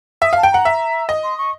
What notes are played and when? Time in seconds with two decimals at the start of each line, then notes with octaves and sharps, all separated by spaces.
0.22 E5 D#6
0.33 F5 A5
0.43 G5
0.51 F#5 A#5
0.65 E5
1.09 D#5
1.23 C6
1.37 C#6